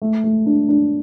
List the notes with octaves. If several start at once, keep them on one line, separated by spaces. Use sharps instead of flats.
A3
A3
D4
D4